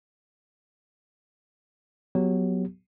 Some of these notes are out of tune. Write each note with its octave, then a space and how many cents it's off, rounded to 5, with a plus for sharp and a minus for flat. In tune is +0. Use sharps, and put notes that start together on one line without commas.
F#3 +0 B3 +0 G4 +5